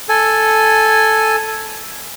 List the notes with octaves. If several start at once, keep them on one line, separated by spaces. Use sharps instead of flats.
A4 G#5